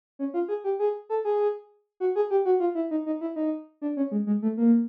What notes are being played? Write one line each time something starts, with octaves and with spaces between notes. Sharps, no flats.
C#4
F4
G#4
G4
G#4
A4
G#4
F#4
G#4
G4
F#4
F4
E4
D#4
D#4
E4
D#4
D4
C#4
G#3
G#3
A3
A#3